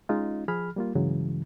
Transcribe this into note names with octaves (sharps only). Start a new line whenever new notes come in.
G#3 C#4 D#4 F4
F3 G#4 B5 F6
G3 A#3 F4
G2 C#3 E3 F#3 G#3